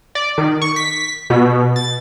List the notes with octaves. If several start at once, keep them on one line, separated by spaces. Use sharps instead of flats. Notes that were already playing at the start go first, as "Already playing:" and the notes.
D5
D#3
C#6
B6
B2
A6